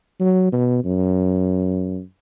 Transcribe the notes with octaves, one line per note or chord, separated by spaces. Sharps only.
F#3
B2
F#2